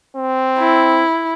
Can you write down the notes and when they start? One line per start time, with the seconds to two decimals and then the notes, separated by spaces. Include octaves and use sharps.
0.16 C4
0.59 E4